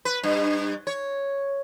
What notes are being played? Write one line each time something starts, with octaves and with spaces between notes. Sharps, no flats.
B4
G2
C#5